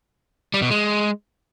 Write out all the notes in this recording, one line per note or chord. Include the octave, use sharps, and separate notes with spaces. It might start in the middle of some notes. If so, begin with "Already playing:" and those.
G3
B2
G#3